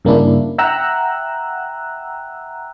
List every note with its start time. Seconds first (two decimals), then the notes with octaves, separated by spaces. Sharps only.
0.05 G2 C#3 A#3 C#4 D4 E4
0.58 E5 F#5 G5 A#5 E6 F#6